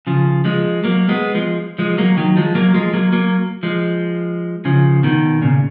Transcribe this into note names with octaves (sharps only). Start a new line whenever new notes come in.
C#3 F3
F3 G#3
F#3 A#3
G#3 B3
F3 G#3
F3 G#3
F#3 A#3
D#3 F#3
F3 G#3
F#3 A#3
F3 G#3
F#3 A#3
F#3 A#3
F3 G#3
C#3 F3
B2 D#3
A#2 C#3